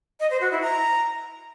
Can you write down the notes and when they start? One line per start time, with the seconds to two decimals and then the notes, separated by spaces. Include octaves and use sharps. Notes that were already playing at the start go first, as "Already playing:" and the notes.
0.20 D#5
0.30 C5
0.41 F#4
0.51 E4
0.62 A#5